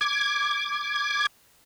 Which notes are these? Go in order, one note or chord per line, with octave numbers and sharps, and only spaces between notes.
D6 G#6